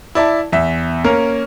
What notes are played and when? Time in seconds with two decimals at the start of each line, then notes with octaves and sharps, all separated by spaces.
0.15 E4 D5 E5 A5
0.52 E2 E5
1.04 A#3 C#4 A#4